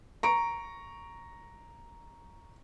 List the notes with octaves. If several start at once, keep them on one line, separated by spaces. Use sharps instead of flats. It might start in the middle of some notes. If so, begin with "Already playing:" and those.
A#5 C#6 D7